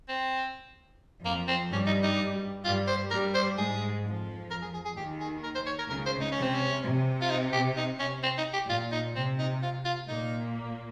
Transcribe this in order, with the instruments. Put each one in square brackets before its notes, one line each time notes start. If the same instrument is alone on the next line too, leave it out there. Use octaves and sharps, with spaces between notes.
[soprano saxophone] C4
[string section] F2 F3 [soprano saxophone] A#3
[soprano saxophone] C4
[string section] G2 G3 [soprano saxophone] C#4
[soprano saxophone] D#4
D#4
[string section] G2 G3 [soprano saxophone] F4
[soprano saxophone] C5
[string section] G2 G3 [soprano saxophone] A#4
[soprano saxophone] C5
[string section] G#2 G#3 [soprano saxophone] G#4
[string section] F2 F3
[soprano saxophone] A#4
G#4
G#4
G#4
[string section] D#2 D#3 [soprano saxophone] G4
[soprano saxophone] G#4
A#4
C5
C#5
A#4
[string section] C#2 C#3 [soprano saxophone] A#4
[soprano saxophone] C5
D#4
C#4
[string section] C3
[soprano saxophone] C4
C#4
[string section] C3
[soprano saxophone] F4
D#4
G4
D#4
C#4
C4
D#4
G4
[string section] A#2 [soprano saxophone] F4
[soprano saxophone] D#4
[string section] C3 [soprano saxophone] C4
[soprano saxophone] D#4
F4
F4
[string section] A#2 A#3 [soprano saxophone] D#4